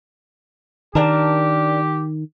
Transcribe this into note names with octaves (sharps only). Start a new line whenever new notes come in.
D#3 D4 G4 A#4 A5